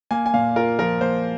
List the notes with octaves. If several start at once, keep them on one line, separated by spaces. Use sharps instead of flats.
A#3 G#5
G#5
A#2 F5
F4 A#4
F3 A#4
A#3 C5